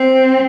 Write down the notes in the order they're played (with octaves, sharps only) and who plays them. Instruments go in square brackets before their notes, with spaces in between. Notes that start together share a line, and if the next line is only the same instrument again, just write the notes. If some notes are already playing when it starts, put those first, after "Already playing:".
Already playing: [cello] C4